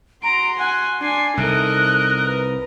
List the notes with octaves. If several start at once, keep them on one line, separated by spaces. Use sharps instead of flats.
F#4 A#5 C6 D7
F#5 G#5
D4 G#5 C7
C2 C3 D#4 A4 A#4 D#5 F#6
B4 A#5